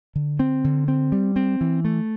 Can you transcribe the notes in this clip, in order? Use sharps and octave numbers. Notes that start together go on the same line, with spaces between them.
D3
C4
D3
C4
G3
C4
E3
A3